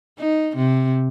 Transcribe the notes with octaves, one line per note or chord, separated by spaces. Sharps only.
D#4
C3